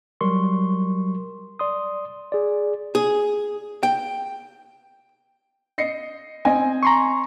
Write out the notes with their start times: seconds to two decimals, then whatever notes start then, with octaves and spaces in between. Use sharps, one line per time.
0.21 F#3 G3 A#4 C6 C#6
1.59 D5 C6 D#6
2.32 G#4 D5
2.95 G#4
3.83 G5
5.78 D#5 C7 C#7
6.45 C4 D#5 G#5
6.83 A#5 C6 C#6